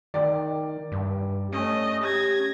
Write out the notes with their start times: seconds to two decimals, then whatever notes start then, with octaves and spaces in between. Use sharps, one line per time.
0.14 D#3 D5 G5
0.92 G2
1.53 A3 C#4 D#5
2.04 G4 G#6 A#6